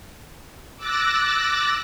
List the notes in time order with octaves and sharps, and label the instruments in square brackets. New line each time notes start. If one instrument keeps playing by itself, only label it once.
[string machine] D6 E6 F#6 A6 A#6